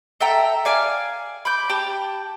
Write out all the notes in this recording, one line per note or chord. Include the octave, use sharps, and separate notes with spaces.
A4 E5 G5 A#5
D5 F5 G#5
B5 D6 G6
G4 G5 A5